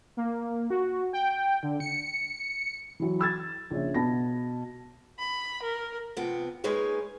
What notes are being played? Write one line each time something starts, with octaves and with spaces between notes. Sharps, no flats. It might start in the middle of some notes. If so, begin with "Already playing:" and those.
A#3
F#4
G5
D3
C#7
E3 F#3
B5 E6 G#6 A6
A#1 C#3 E5
B2 B3 A5 B5 A#6
B5
A#4
C3 F3 B3 G5
G#3 A#3 D#4 G#4 B4 C#5